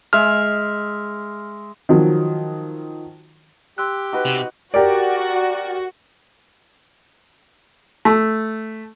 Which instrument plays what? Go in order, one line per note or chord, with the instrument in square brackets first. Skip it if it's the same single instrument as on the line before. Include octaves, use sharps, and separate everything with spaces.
[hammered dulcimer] G#3 E5 [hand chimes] F6
[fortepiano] D#3 F3 F#3
[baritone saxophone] G4 [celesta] C6 E6 F#6
[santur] D#4 F#4 B4
[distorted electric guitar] C3
[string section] F#4 [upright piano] G4 A#4 D5
[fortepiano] A3